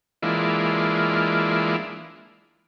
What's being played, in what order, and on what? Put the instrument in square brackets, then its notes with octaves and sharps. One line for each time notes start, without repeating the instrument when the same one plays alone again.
[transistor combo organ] E3 G#3 A#3 D4 E4 F4